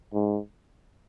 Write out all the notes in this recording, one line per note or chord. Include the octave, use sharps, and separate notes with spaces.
G#2